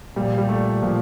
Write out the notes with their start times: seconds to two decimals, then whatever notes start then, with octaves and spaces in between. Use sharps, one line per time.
0.16 A#2 F3 G3
0.38 G3
0.49 A3
0.82 A#2 F3